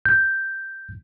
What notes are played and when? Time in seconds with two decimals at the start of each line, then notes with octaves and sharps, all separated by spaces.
0.06 G6